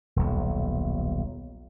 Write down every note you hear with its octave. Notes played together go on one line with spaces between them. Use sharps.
D#1 B1